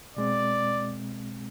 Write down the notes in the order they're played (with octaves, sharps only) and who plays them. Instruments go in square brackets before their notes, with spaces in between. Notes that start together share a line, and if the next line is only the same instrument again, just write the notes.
[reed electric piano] B2 G#3 C4 [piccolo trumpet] D5